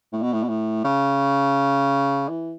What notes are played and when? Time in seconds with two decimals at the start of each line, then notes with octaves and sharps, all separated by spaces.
0.13 A2
0.22 B2
0.33 A2
0.43 B2
0.49 A2
0.84 C#3
2.29 E3